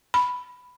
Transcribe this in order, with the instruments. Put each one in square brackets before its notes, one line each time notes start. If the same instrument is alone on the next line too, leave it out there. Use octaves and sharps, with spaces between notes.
[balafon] B5